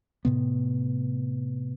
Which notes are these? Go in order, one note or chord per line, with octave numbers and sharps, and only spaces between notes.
A2 C3 B3